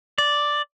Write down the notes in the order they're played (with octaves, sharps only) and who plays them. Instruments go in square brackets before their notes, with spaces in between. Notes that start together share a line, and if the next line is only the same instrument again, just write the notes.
[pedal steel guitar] D5